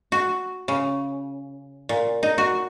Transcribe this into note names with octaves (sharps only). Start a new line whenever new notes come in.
F#4
C#3
A#2
D#4
F#4